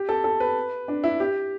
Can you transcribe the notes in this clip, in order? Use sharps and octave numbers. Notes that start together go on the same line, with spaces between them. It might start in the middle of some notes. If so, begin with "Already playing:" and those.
Already playing: G4
A4
A4
B4
D4
E4
G4